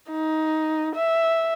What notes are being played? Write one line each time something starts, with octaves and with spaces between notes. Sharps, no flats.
D#4
E5